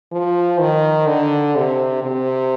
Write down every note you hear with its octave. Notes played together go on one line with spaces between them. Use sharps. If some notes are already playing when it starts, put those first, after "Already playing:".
F3
D#3
D3
C3
C3